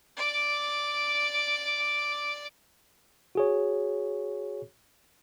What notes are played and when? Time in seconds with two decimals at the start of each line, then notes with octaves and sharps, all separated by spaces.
0.17 D5 D6
3.35 F#4 G#4 C#5